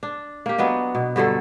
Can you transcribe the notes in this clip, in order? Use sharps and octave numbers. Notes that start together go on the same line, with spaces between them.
D4
A#3 G4
F#3 B3 D4 D#5
B2
G2 D3 F#3 A4